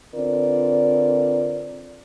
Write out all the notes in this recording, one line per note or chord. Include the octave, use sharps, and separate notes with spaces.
D3 C4 F4 A#4 B4 D5